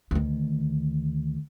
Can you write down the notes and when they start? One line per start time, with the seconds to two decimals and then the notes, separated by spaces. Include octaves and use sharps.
0.11 D2 D#3